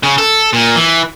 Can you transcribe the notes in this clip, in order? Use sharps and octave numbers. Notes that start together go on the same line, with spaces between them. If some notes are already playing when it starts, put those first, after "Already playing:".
C#3
A4
A#2
E3